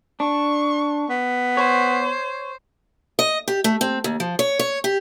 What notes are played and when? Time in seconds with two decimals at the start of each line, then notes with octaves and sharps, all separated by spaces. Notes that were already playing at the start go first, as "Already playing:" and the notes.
0.20 D4 C#6
1.10 B3
1.57 C5 C#5
3.19 D#5
3.48 G4
3.64 A3
3.81 C4
4.04 D#2
4.20 F3
4.39 C#5
4.59 C#5
4.84 G4